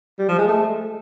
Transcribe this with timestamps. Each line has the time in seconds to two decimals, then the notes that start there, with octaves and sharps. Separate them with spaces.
0.19 G3
0.28 F3
0.38 G#3
0.48 A3